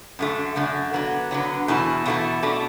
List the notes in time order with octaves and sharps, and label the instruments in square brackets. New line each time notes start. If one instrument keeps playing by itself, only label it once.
[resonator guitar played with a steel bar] F#2 D3 A3
F#2 D3 A3
D3 F#3 B3
D3 F#3 B3
E2 B2 A3 E4
E2 B2 A3 E4
B2 A3 D4